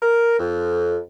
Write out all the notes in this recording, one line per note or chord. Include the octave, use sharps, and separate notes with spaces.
A#4
F2